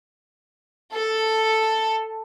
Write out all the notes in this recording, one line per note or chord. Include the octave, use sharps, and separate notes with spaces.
A4